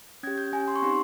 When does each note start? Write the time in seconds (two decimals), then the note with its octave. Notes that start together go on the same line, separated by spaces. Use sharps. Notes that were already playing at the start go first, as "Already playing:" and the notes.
0.23 C#4 G4 G#6
0.38 G6
0.52 C#4 G4 G#5
0.68 C6
0.76 C#6
0.82 C4 D#4 G4 C6